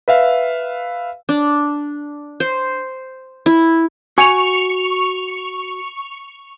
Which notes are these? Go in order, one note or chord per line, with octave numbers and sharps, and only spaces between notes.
B4 E5 F5
D4
C5
E4
F#4 G#5 C#6 C#7 F7